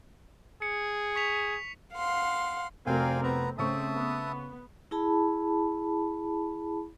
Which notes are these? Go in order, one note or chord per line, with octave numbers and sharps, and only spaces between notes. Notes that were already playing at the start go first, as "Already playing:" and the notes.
G#4 C#7
C#6 B6 F7
F5 F#5 C6
F1 C4 F#4 A#4 D5 F5 G5 G#5
B3 C4 B4 A#5
C#3 A3 C4 E5 A5 C#6 D#6
B3
E4 G#4 A5 B5